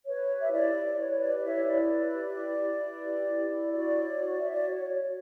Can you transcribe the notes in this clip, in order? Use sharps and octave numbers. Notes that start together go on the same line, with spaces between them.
B4 C#5
G4
E5
E4 D5
E4
B4 C#5
G4 D5
D5
E4 C#5 E5
E4 D5
B4
G4
E4
E4
B4
G4
E4
E4
F#4 D5
C#5
F#4
C#5 E5
D5
F#4 C#5
C#5